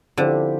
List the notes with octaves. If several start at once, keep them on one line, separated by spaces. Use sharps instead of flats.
D3 F3 C4 E4 G4 C5